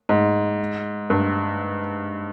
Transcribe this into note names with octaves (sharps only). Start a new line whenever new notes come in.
G#2
G2